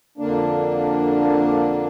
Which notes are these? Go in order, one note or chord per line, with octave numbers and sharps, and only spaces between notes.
F2 D3 A#3 D4